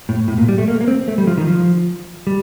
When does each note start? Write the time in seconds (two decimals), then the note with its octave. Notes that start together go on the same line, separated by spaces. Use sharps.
0.09 A2
0.28 A2
0.38 A#2
0.48 G3
0.58 A3
0.68 A#3
0.81 A#3
0.88 C4
1.08 A3
1.18 G3
1.27 F3
1.38 D#3
1.47 F3
2.27 G3